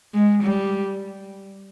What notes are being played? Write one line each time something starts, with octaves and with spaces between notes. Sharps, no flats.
G#3
G3